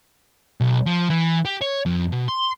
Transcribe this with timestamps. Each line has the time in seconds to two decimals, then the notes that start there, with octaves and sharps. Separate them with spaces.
0.60 B1
0.86 F3
1.10 E3
1.45 G4
1.61 C#5
1.86 F2
2.12 B2
2.28 C6